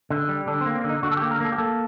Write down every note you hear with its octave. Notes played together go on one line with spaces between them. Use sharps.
D3
G3
D3 D4
C4
A#3
C4
D3
D#4
D3 F#4
A4
G4
A#3
A#4
A#3 A4
G4
A#3 A4